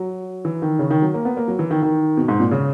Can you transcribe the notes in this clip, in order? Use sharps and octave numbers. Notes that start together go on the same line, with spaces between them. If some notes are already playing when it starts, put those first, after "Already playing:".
Already playing: F#3
E3
D#3
C#3
D#3
F#3
A#3
B3
A#3
F#3
E3
D#3
D#3
B2
G#2
A#2
C#3